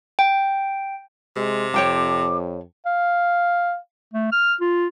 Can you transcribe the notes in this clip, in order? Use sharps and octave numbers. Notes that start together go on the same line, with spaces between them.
G5
C3 G#3
F2 C#5 G5 A5 D6
F5
A3
F6
F4